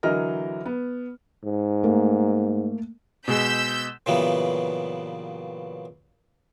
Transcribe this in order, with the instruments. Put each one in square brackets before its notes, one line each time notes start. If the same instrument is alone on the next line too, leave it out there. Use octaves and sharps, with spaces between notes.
[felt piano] D3 E3 F#3 A#4 D#5 F6
B3
[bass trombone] G#2
[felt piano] A3 A#3
[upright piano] B2 G#3 [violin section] E6 G6 B6
[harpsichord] A#2 C#3 E3 F#3 G3 B3